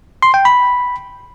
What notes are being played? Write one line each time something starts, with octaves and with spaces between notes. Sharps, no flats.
C6
G5
B5